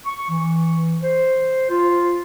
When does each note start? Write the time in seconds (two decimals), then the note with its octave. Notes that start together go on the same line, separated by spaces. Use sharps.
0.06 C#6
0.30 E3
1.03 C5
1.70 F4